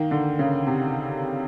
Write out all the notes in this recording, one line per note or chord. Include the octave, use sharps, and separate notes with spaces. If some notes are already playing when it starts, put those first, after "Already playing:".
Already playing: D#3 A#3
D3
C#3
C3